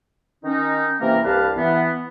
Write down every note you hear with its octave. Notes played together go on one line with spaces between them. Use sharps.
D#3 C#4 D#4
C3 E3 A#3 C#4 A#4
C2 G2 G4 B4 F5 A5
E3 B3